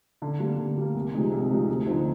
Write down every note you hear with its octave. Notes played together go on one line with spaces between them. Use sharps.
D3
G3 A#3
D3
G3 A#3
C2
C3 F3 G#3 D#4
C2
C3 F3 G#3 D#4
D2
D3 F3 C4 D#4